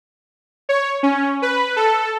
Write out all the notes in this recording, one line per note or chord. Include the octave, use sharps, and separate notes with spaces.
C#5
C#4
B4
A4